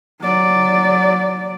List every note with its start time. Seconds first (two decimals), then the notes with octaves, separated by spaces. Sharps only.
0.21 F#3 D5